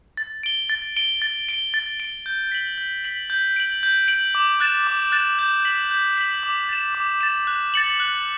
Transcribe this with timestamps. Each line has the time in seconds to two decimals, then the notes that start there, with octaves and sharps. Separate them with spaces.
0.17 A6
0.43 D7 G7
0.69 A6
0.96 D7 G7
1.22 A6
1.49 D7 G7
1.74 A6
2.00 D7 G7
2.26 G6
2.52 B6 F#7
2.78 G6
3.04 B6 F#7
3.30 G6
3.56 D7 F#7
3.83 G6
4.08 D7 F#7
4.35 D6
4.60 F#6 A6 E7
4.87 D6
5.12 F#6 A6 E7
5.39 G6
5.65 B6 F#7
5.91 G6
6.17 B6 F#7
6.43 D6
6.69 A6 E7
6.95 D6
7.21 A6 E7
7.47 F#6
7.74 A6 C#7 F#7
8.00 F#6